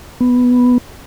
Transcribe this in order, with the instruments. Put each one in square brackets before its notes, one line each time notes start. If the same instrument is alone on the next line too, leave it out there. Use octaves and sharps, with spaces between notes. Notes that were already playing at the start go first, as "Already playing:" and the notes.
[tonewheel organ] B3